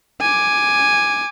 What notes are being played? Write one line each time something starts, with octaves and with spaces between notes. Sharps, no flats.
G#5 D6